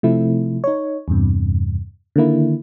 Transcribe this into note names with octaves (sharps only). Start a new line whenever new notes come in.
C3 F3 A3 E4
D#4 C#5
E2 G2 C3
D3 D#3 A#3 E4